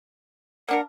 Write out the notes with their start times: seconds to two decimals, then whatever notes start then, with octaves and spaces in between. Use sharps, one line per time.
0.69 A#3 D4 A#4 F#5